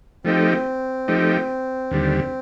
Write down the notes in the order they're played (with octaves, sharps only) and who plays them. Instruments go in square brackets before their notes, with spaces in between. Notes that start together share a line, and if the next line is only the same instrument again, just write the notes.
[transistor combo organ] F3 A3 D#4 G4 [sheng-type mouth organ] C4
[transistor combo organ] F3 A3 D#4 G4
D#2 D3 G3